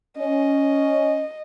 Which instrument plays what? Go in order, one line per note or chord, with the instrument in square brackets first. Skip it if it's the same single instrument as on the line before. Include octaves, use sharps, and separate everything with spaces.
[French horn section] C#4 [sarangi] D#5